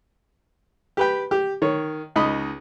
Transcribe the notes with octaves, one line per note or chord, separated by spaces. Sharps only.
G4 B4 G5
G4
D#3 C#5
C#2 D#4 D#5 B5